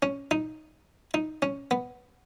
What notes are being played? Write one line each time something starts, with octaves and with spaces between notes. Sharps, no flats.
C#4
D#4
D#4
C#4
B3